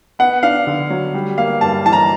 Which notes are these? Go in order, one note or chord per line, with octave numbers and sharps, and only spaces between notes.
B3 F#5
D4 F5
D3
F#3
G3
A#3 F5
G2 A5
E3 A5
A#5